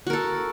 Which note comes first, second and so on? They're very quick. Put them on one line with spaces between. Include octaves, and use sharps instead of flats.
F#4 A#4 A4